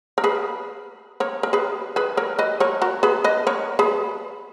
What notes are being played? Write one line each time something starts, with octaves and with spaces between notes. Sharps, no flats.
A#4
G#4 B4
A#4 C#5
A#4
G#4 B4
G#4 B4
A#4 C#5
B4 D#5
A#4 C#5
F#4 A#4
G#4 B4
B4 D#5
A#4 C#5
G#4 B4